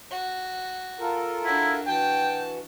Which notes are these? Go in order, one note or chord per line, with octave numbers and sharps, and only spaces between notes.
F#4
F4 A4 A#4
D4 E4 F#4
E3 F#4 G5 A5